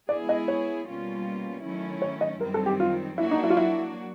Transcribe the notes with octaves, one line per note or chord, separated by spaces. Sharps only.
G#3 B3 E4 G#4 D5
D#5
C#5
B2 G3 A#3 C#4 F4
D#3 F#3 A3 C#4 E4
C#5
D#5
F#2 D#3 G3 C4 A#4
A4
G4
F4
F#3 A#3 D4 E4 F#4
D#4
E4
F4
E4